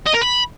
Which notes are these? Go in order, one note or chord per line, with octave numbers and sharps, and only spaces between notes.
D#5
A#4
B5